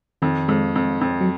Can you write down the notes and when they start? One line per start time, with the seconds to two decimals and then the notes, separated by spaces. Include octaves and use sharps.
0.22 F2 D#3
0.48 F2 G#3
0.76 F2
1.01 F2
1.21 F#3